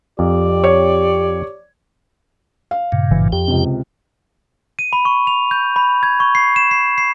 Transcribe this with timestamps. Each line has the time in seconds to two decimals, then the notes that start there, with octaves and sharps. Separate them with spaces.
0.19 F2 G4 D5
0.64 C#5
2.71 F5
2.92 G2 A#2 C#3
3.11 G#1 E3
3.32 F2 G4 G5
3.48 C#2 C3
4.79 D#7
4.93 B5
5.05 C#6
5.27 F7
5.51 G6
5.76 B5
6.03 G#6
6.20 C#6
6.35 C7
6.56 E7
6.71 C7
6.98 C7